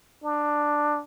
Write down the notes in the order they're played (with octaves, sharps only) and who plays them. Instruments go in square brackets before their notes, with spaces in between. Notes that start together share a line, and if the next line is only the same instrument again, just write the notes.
[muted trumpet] D4